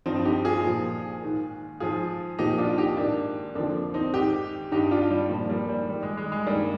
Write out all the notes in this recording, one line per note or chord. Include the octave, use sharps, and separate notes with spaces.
G2 F3 C4 D#4
D#4 G4
F4 G#4
A#2 F3
G#2 D#3
G#2 F3 F4 G#4
A#2 F3 D#4 G4
D4 F4
D#4 G4
G#2 D#3 A#3 D4
F2 D3 F3 A#3 D4
C4 D#4
G#2 D#3 D#4 G4
G2 D#3 D#4 G4
D4 F4
G3
A#2 F3
G3 A#3
G3
G#2 D#3 G3
G#3
G#3
G#3
G2 D#3 G3 A#3